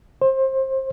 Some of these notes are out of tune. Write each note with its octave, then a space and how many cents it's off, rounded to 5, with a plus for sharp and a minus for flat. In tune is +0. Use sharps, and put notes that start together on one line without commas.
C5 +25